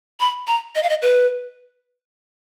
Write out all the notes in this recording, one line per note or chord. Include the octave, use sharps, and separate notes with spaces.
B5
A#5
D#5
F5
D#5
B4